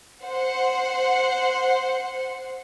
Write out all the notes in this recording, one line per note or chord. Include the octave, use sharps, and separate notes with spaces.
C5 F#5